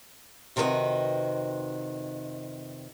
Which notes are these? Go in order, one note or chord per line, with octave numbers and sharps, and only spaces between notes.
F2 C3 D#3 F#4 B4 D#5